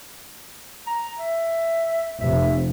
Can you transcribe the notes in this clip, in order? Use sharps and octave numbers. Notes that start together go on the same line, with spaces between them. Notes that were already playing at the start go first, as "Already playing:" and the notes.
A#5
E5
F1 E5